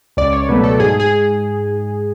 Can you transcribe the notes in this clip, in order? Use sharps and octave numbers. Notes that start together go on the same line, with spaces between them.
C#2 D5
C#5
B2 F#3 A3 B4
A4
G#2 G#4
G#4